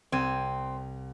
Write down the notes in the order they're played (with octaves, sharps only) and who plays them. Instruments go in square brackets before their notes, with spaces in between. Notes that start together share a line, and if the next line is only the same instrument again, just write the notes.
[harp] C2 G#6 D#7 [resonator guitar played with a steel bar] C4